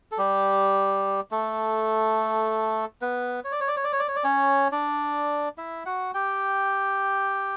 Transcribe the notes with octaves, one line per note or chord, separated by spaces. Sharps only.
A4
G3 G4
A3 A4
B3 B4
C#5
D5
C#5
D5
C#5
D5
C#5
D5
C#5
D5
C#4 C#5
D4 D5
E4 E5
F#4 F#5
G4 G5